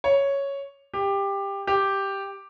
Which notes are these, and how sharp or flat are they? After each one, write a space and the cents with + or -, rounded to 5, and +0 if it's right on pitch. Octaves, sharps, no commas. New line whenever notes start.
C#5 +0
G4 +15
G4 +0